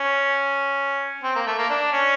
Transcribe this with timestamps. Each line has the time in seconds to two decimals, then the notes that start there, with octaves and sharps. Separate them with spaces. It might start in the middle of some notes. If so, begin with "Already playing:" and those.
Already playing: C#4
1.23 C4
1.36 A#3
1.47 A3
1.59 A#3
1.70 D4
1.93 C#4